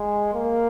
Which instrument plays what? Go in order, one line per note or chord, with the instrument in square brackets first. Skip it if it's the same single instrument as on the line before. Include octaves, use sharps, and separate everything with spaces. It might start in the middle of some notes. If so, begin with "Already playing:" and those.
Already playing: [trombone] G#3
A#3